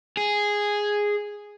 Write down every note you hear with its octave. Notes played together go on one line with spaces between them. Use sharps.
G#4